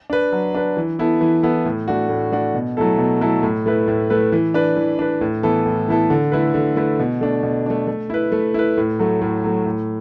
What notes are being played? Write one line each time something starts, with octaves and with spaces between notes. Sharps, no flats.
D4 B4
F#3
D4 B4
E3
B3 E4 A4
E3
B3 E4 A4
A2
A3 D4 F#4
A2
A3 D4 F#4
B2
F#3 A3 E4 A4
B2
F#3 A3 E4 A4
A2
A3 E4 B4
A2
A3 E4 B4
E3
D4 B4
E3
D4 B4
A2
E3 B3 E4 A4
A2
E3 B3 E4 A4
D3
A3 E4 B4
D3
A3 E4 B4
B2
A3 D4
B2
A3 D4
A3
E4 B4
A3
E4 B4
A2
F#3 A3
A2
F#3 A3
A2